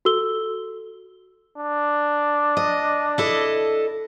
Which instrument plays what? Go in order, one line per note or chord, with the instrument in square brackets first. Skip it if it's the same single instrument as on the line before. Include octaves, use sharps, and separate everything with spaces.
[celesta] F#4 A4 E6 G7
[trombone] D4
[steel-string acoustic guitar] D#5
E4 A4 D#5